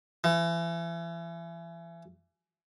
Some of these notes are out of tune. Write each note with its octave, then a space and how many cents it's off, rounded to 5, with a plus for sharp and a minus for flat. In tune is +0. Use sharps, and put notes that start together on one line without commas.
E3 +35